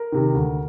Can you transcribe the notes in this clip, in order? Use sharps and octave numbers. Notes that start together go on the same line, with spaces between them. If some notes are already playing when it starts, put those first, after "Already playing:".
Already playing: A#4
C3 D#3
D2